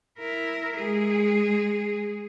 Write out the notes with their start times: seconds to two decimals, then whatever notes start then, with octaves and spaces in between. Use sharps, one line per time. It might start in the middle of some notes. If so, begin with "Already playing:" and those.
0.19 E4 A#4
0.76 G#3 G#4